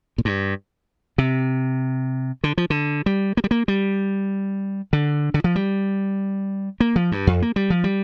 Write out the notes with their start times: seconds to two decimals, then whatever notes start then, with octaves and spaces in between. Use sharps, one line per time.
0.18 A#2
0.25 G2
1.18 C3
2.44 D3
2.58 F3
2.70 D3
3.06 G3
3.37 A#3
3.44 G3
3.51 A#3
3.68 G3
4.93 D3
5.34 D3
5.44 F3
5.56 G3
6.80 A#3
6.96 F3
7.12 G2
7.27 F2
7.42 A#3
7.56 G3
7.70 F3
7.84 G3